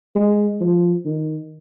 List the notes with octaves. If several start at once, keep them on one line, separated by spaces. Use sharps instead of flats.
G#3
F3
D#3